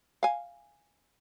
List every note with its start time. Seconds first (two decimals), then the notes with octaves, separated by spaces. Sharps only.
0.23 F5 G#5